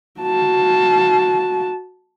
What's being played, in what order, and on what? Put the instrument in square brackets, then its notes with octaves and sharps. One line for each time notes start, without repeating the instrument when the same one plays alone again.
[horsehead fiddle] F#4 A5